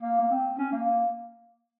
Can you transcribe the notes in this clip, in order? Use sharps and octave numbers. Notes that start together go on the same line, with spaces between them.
A#3
A#3
C4
C#4
A#3